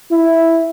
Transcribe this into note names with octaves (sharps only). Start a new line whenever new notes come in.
E4